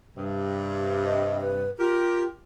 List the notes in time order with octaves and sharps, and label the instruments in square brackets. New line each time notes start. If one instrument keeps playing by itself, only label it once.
[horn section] G2 C3
[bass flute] D#5
B4
[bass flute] F4 [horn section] G4 A#4